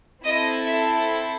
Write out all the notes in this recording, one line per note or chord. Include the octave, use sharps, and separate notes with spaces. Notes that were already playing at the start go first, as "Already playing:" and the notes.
C4 E4 A4 D#5
E5